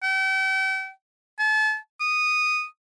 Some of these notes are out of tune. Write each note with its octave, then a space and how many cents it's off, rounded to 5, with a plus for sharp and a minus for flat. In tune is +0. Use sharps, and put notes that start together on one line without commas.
G5 -40
A5 -35
D#6 -10